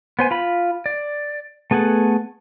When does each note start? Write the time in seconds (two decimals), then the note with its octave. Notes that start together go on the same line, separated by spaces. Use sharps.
0.19 B3 C5 G#5
0.31 F4 B5
0.86 D5
1.71 A3 B3 G#4 A4 F#5